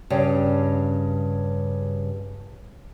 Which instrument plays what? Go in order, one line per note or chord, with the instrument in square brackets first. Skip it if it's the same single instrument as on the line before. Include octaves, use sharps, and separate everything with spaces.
[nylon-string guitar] G2 C#3